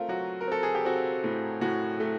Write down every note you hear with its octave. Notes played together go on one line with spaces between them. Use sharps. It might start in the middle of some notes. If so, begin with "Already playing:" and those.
Already playing: A3 C4 F4 A#4
F#3 F#4
A#4
C4 A4
G#4
G4
C4 F#4
A2
A2 F#4
A3